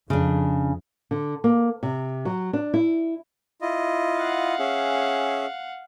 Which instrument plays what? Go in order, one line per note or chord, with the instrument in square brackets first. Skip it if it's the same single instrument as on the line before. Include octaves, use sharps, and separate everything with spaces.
[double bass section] F2 [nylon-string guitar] C#3 D4
[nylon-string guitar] D3
A#3
C3
F#3
D4
E4
[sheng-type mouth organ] E4 F4 D#5
[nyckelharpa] F5 F#5
[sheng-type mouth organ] C#4 G#4 E5